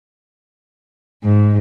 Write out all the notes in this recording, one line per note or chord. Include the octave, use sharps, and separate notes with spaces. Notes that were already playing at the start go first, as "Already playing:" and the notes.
G#2